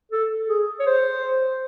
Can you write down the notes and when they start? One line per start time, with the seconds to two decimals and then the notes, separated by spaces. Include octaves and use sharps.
0.12 A4
0.49 G#4
0.80 C#5
0.86 C5